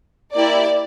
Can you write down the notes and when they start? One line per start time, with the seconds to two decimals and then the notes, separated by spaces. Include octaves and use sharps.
0.34 A#3 E4 G4 D5